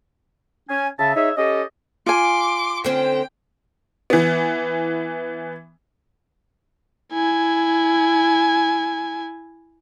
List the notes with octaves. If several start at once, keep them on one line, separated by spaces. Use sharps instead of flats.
C#4 G#5
C#3 E5 A5
D#4 G#4 C#5 E5
C#4 G4 A4 D#5
F4 G#5 C6 D6
D3 C4 C#4 G5
E3 B3
E4 G#5